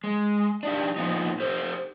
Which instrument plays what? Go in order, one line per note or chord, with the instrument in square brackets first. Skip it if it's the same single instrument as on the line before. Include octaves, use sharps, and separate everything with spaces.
[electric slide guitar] G#3
D4 D#4 G4
A#2 F3 B3 D#4
G4 A4 C5